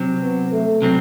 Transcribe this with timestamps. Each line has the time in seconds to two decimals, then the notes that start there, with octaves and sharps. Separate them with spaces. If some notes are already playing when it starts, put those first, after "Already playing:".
Already playing: C3 F#3 C4
0.21 B3
0.52 A3
0.82 C3 F#3 C4